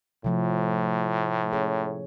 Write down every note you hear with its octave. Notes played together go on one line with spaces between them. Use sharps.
A2 C3 F3 A3
C#4 G#4 C#5